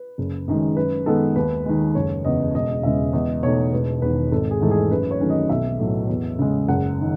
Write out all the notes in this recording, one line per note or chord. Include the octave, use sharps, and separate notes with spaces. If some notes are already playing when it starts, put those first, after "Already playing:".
Already playing: B4
F#1
F#2 D#3 G#3
F#2 B4
D#3 G#3 B3 A4
D#2 B4
D#3 G#3
F#1 C#5
E2 C#3 D#5
E1 D#5
E2 C#3 G#3 E5
E2 D#5
B2 A3 D#4 C#5
E1 B4
E2 D#3 B4
G#1 A4
G#4
G#2 E3 A3 D#4
G#4
F#2 B4
C#5
D#3 F#3 A3 C#4
D#5
B1 E5
A2 F#3
E2
C#3 G#3
F#1 F#5
D#3